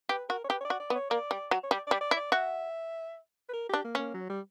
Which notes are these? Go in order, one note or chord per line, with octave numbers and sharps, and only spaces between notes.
G4 B4
F#4 A#4
C#5
G4 B4
C#5
D5
F#4
D5
B3
C#5
A#3 D5
G3
F#3
C#5
G3 D5
G3 D5
D5
E4
D5
F#4 E5
B4
A#4
D4 G4
A#3
A#3 C#4
F#3
G3